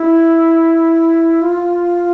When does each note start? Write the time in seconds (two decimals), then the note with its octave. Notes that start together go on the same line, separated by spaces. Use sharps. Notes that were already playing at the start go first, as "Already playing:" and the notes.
Already playing: E4
1.41 F4